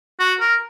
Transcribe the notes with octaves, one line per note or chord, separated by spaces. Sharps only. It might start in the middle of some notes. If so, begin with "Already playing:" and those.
F#4
A#4